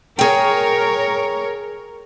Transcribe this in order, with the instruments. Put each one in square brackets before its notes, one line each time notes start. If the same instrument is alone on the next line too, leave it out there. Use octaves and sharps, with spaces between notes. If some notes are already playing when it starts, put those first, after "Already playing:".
[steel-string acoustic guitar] G#4 G5 [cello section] A#4 C#5